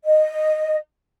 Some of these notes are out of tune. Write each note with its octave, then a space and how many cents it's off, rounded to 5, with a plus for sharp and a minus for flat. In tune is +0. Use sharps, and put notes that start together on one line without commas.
D#5 -10